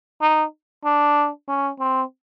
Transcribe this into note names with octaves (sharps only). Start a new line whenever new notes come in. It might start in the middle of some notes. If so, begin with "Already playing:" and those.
D#4
D4
C#4
C4